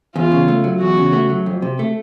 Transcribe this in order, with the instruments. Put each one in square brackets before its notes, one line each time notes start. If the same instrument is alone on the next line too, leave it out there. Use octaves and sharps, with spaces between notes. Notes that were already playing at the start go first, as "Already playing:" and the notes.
[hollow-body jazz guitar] E2 [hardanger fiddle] F4
[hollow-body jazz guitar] C#3
A3
F#3
[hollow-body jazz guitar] E2 [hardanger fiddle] F#4
[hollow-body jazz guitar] C#3
A3
F#3
F2
C3
A3